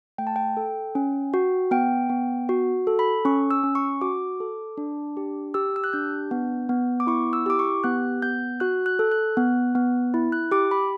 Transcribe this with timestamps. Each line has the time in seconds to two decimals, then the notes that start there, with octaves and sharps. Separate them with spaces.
0.18 A3 G5
0.27 A5
0.36 G5
0.57 A4
0.95 C#4
1.34 F#4
1.71 B3 G5
2.09 B3
2.49 F#4
2.87 A4
2.99 B5
3.25 C#4 C#6
3.51 E6
3.64 C#4
3.75 C#6
4.01 F#4 D6
4.40 A4
4.77 D4
5.17 G4
5.54 G4 E6
5.76 E6
5.84 F#6
5.93 D4 G6
6.31 B3
6.69 B3
7.00 D6
7.07 E4 C#6
7.33 E6
7.46 G4 D6
7.59 C#6
7.84 B3 F#6
8.22 B3 G6
8.60 F#4 F#6
8.86 F#6
8.99 A4
9.11 F#6
9.37 B3
9.75 B3
10.14 E4
10.32 F#6
10.51 G4 D6
10.71 B5